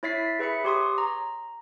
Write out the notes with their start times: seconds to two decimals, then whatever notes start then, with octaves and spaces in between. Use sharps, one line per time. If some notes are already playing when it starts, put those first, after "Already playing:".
0.03 E4 C#5 E5 A6 B6 C7
0.39 G#4 B4 E5 B5 C#7
0.64 G4 C#5 C6 C#6 D#6
0.98 A#5